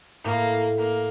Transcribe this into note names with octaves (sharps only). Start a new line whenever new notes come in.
A2 A#3
A#3